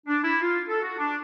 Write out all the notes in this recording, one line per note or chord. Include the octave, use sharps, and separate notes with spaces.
D4
E4
F4
A4
F#4
D4